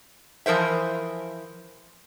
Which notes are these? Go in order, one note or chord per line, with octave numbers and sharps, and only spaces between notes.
E3 F3 A#4 C5 E5